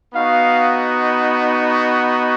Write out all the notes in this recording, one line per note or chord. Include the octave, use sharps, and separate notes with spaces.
B3 D#4 F#4 F5